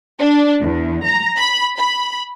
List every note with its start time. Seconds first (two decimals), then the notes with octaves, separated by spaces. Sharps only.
0.20 D4
0.63 E2
1.05 A#5
1.38 B5
1.78 B5